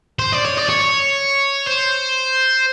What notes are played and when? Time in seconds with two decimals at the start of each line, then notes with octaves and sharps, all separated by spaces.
0.19 C5
0.32 D5
0.45 C#5
0.57 D5
0.69 C#5
1.67 C5